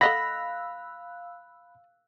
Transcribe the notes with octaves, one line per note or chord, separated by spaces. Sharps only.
A4 D#5 F5 F#5 B5 E6 F#6 A#6